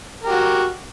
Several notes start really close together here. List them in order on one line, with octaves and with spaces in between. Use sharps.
A#4 G4 F#4